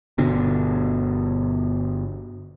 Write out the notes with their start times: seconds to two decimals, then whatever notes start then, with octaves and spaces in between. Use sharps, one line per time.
0.18 G1 B2 D3